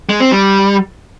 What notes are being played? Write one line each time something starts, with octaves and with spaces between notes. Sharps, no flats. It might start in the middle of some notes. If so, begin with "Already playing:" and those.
G#3
C4
G3